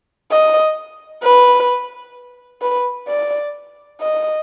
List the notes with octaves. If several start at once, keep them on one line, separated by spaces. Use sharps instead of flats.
D#5
B4
B4
D5
D#5